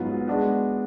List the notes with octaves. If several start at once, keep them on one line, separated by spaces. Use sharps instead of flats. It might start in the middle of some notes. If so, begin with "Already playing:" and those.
Already playing: G#2 F#3 B3 F4
G#3 B3 D4 F#4